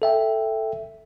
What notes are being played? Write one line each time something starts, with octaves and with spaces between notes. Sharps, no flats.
A4 E5 G5